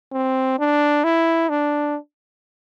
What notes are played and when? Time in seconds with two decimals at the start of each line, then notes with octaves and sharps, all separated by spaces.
0.13 C4
0.59 D4
1.04 E4
1.49 D4